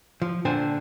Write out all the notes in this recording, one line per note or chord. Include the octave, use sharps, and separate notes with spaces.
F3
A#2 D3 D4 C5 G5 G#5